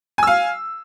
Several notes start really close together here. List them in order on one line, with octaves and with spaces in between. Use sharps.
G#5 E6 F5